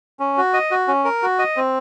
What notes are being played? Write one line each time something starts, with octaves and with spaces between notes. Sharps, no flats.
C#4
F#4
D#5
F#4
C#4
A#4
F#4
D#5
C4